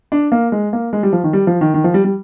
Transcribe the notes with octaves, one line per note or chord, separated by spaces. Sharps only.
D4
A#3
G#3
A#3
G#3
G3
F3
D#3
G3
F3
D#3
D#3
F3
G3
G3